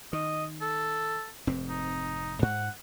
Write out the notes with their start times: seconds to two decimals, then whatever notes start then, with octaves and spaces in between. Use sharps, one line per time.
0.13 D#3 D#5
0.61 A4
1.47 F1 G#2 C4
1.69 D#4
2.42 G#2 F#5